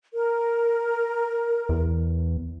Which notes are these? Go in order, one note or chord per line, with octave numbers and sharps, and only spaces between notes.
A#4
E2